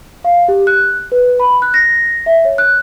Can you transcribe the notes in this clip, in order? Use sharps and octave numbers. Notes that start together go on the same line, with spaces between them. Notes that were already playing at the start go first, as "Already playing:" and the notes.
F5
G4
F#6
B4
B5
F#6
A#6
E5
C#5
F#6